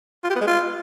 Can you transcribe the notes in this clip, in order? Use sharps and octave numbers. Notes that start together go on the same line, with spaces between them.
F4
G4
B3
G#3
F4